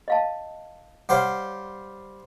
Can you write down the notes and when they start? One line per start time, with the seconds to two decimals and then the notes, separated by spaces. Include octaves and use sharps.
0.08 D#5 F5 A5
1.09 G3 C5 C#5 F5 F#5